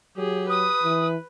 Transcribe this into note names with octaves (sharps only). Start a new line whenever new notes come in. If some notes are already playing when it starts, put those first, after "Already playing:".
F#3 G4 G#4
B4 D#6
E3